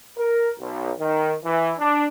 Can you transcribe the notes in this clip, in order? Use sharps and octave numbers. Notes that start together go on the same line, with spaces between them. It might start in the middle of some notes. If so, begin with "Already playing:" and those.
A#4
B1
D#3
E3
D4